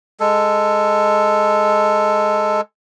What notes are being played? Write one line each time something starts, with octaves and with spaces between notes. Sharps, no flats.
G#3 A4